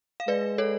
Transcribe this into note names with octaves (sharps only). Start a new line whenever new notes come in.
F5
G#3 B4 D5
A4 C#5